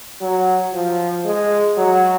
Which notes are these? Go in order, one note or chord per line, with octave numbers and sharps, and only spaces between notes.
F#3
F3
G#3
F#3